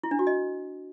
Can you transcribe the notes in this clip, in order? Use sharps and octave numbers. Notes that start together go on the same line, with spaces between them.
E4
D4
F#4
D#5